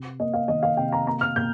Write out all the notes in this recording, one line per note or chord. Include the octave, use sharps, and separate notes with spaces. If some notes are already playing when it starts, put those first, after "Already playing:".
Already playing: C3
A#3 D#5
F5
D#3 D#5
F5
C3 G5
A#5
A#3 A#5
F6
A#2 G6